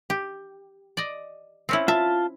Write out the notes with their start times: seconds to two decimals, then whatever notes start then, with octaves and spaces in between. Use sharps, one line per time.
0.10 G4
0.97 D5 D#5
1.69 C4 C#4 E4
1.88 F4 E5 A5